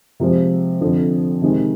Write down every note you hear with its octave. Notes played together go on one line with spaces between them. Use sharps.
C3 F3 G#3 C4 F4
F2 D3 F3
C3 D#3 G#3